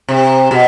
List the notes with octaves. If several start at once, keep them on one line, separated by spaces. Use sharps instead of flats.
C3
B2